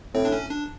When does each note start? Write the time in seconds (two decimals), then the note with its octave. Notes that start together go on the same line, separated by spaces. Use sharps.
0.14 A2 C4
0.25 D4
0.32 C#4
0.51 D4